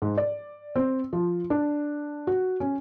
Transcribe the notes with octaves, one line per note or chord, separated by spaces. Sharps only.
G#2
D5
C4
F3
D4
F#4
C#4